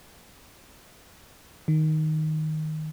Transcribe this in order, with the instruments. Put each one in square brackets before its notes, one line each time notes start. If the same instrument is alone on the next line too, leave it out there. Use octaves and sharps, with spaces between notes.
[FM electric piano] D#3